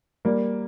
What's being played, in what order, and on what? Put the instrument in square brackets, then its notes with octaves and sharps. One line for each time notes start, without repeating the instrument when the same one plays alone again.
[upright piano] G3 A#3